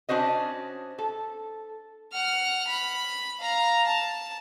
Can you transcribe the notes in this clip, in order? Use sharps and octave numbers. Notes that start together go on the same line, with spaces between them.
C#4 D4 F#4 C5 D#5
A4
F#5 F6
B5
F5 A#5
A5